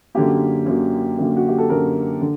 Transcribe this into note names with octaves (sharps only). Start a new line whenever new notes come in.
F#2 D3 F#3 A#3 G4
F#2 D3 F#3 A#3
F#2 D3 F#3 A#3
F#4
G4
A4
F#2 D3 F#3 A#3 A#4
D3